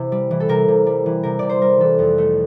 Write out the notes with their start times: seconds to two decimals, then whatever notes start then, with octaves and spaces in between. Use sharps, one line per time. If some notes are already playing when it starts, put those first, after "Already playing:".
Already playing: C3 E3
0.12 G3
0.31 E3
0.40 A4
0.49 C3 A#4
0.68 C3
0.86 G3
1.06 E3
1.23 C3 A#4
1.39 C3 D5
1.49 C5
1.61 G3 A#4
1.80 E3 A4
1.99 F2
2.18 A3